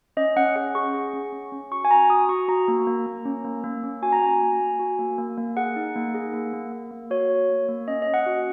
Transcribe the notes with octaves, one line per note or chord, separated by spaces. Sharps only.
C#4 D#5
C#4 F#5
G#4 F#5
G#4 C#6
G#4
C#4
C#4
C#4
F#4 C#6
G#5
F#4 A#5
F#4 D#6
F#4 C#6
F#4 A#5
A#3
A#3
A#3
C#4
A#3
A#3
C#4
F#4 G#5
A#5
F#4 G#5
A#3
A#3
F#4
A#3
A#3
A#3
G#4 F#5
D#4
A#3
G#4
A#3
A#3
A#3
A#3
F#4 C#5
A#3
A#3
A#3
C#4 D#5
D#5
C#4
F#5
F#4